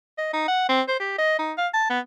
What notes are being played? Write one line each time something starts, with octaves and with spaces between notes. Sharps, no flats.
D#5
D#4
F#5
C4
C5
G4
D#5
D#4
F5
A5
B3